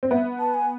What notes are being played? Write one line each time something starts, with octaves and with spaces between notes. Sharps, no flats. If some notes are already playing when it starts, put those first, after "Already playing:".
C4
B3 E5
A5
G#5